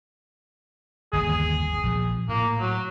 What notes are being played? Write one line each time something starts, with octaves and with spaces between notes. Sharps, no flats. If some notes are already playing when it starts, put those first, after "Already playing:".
G1 D#2 E3 G#4
A#1 F3
A2 A#3
F#3